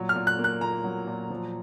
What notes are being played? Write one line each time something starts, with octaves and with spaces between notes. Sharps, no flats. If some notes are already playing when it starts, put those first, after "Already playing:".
Already playing: A#2 F#3
F6
A#2
F#6
A#3
F#6
A#2 A#5
F#3
A#2
F3